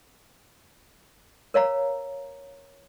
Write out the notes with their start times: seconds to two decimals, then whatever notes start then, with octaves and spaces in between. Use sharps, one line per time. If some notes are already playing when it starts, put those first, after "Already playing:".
1.54 A#4 C#5 F5 A#5